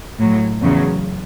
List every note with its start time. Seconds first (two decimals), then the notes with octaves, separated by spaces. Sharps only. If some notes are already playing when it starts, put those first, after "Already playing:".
0.19 A2 F#3
0.61 E2 C#3 F#3